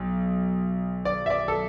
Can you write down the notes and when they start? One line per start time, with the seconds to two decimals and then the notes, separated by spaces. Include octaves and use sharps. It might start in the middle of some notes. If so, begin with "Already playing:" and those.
Already playing: B1
1.05 D5
1.26 E5
1.30 D5
1.48 A4